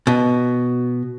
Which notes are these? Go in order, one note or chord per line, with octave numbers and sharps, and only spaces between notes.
B2